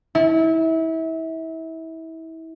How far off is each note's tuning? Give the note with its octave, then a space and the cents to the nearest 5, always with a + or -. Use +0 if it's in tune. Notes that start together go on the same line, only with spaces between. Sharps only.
E4 -30